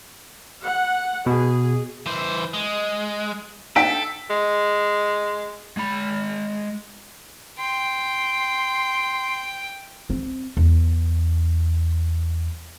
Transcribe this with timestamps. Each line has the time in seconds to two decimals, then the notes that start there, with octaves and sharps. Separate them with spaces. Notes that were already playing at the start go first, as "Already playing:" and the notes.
0.63 F#5
1.26 B2 G#4
2.06 E3 C5
2.54 G#3
3.76 A4 G5 B6 D7
4.30 G#3
5.77 G#3 B5
7.59 G5 C6
10.10 C4
10.57 E2